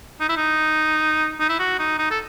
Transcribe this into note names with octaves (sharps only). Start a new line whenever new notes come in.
D#4
E4
D#4
D#4
E4
F#4
D#4
D#4
A4